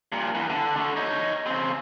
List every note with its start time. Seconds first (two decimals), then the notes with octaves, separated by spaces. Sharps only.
0.12 G2 A#2
0.35 E2 E3
0.50 D3
0.76 D3 A3
0.97 D#4 C#5
1.47 C#3 C4